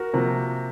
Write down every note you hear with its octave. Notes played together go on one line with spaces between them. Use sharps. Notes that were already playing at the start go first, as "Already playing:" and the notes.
Already playing: F#4 A#4
C3 F3 A#3